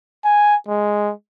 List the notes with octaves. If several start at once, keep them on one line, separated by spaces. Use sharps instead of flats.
G#5
G#3